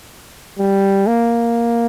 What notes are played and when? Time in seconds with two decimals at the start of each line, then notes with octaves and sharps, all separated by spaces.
0.59 G3
1.07 A#3